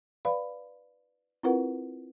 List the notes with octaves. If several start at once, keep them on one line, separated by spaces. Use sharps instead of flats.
B4 D5 F5 B5
C4 E4 F4 A#4 B4 F#5